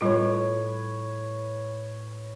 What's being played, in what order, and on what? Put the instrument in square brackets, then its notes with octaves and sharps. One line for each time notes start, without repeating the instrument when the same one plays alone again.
[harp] A2 [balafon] G3 F4 [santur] B4 C#5